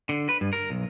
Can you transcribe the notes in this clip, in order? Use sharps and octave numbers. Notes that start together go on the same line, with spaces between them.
D3
B4
G2
A#4
B1